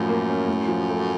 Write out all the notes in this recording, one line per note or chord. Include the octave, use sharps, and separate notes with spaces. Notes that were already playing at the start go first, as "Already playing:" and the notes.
Already playing: F#2 A2 F3
A#3
C#4
A2
F3
A3